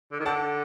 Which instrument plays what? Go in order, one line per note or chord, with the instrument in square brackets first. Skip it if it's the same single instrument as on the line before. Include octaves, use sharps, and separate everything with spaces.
[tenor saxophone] D3
D#3
[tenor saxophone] D3 [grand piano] F#5 A5